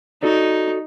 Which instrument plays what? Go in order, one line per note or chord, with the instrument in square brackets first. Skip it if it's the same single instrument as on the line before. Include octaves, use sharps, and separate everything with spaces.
[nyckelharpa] D#4 [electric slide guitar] F#4 A4 D5